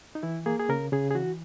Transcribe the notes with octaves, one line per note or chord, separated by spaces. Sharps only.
D#4
E3 E4
A#3 G#4
G#4
C#3 A#4
C#3 G#4
G#4
E3 F#4